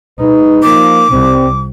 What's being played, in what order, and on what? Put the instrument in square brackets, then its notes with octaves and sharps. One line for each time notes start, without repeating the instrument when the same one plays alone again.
[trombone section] G#3 B4 [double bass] D#4
[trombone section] F3 A#3 [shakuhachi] D6
[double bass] C2 [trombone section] G3 C4